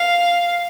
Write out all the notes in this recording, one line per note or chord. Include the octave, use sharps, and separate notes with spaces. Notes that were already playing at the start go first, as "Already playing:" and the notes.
Already playing: F5